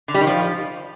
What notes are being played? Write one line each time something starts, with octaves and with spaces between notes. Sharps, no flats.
D3
G3
D#3
F3